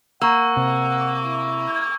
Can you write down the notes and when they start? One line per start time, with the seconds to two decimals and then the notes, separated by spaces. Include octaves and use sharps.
0.22 A#3 F#5 C#6 E6
0.57 C3
1.24 E4